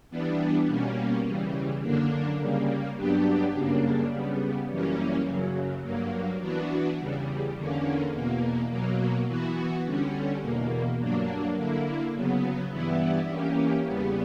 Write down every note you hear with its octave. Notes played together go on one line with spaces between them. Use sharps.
E3 G3 B3 D4
B2 G3 A#3 C#4
C#3 E3 G3
F#2 D3 A#3 D4
C#3 G3 A#3
G2 F#3 B3 D4 G4
F#2 C#3 G3 A#3 D4
C#3 G3 B3
F#2 E3 G3 A#3 C#4
F#2 C#3 F#3
G2 F#3 A#3
E3 B3 D4 F#4
E2 C#3 G3
E2 D3 A#3 C#4
E2 B2 A#3
B2 F#3 A#3
E3 B3 F#4
D3 G3 C#4
E2 B2 A#3
G2 F#3 A#3 D4
D3 A#3 E4
C#3 F#3 B3
G2 E3 G3 B3 E4
E3 A#3 C#4 G4
E2 C#3 G3 B3